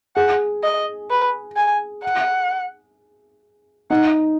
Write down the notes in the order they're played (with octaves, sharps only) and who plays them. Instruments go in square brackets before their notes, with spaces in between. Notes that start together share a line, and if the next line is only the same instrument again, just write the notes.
[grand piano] G#4 [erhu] F#5
[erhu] D#5
B4
G#5
F#5
[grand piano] D#4 [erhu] F#5